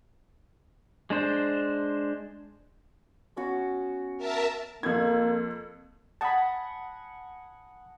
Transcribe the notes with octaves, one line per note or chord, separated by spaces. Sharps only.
G#3 D4 C5
B3 C#4 F#4
A#4 E5 A5
F2 A#3 G#6
D#5 F#5 G#5 A5 B5